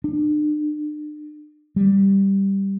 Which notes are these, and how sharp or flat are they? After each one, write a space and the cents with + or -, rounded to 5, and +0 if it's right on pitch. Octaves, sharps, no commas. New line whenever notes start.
D4 +40
G3 +0